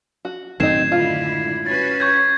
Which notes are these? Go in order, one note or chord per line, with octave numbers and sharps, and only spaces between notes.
F#4
F#2 A2 D#3 C4 D#4 G#6 C7 E7
D3 G#3 E4 F4
C#4 F#4 B4 A6
C#6 G6 G#6